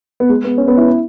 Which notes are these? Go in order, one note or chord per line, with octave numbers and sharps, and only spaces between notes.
B3
G#3
B3
C#4
B3
E4